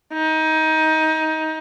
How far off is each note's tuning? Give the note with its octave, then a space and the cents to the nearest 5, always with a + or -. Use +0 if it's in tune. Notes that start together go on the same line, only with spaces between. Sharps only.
D#4 +20